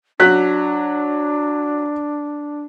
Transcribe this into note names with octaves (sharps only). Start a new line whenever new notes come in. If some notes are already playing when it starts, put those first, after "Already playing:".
F#3 D4 F#6 B6